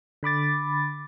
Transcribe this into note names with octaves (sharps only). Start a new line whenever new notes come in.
D3 B5 D6 A6